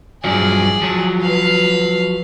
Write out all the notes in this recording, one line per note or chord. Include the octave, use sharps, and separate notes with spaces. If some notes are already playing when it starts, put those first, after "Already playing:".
G2 F3 F#3 G#4 D5
F3 F#3
B4 F5